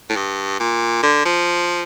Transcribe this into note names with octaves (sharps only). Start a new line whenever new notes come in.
A2
G2
A#2
D3
F3